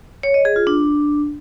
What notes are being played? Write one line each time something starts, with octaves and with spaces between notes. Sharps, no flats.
C#5
D#5
G#4
F4
D4